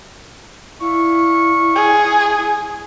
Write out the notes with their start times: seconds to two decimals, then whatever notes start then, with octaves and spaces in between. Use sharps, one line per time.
0.81 E4 D5 F5 C#6
1.75 G#4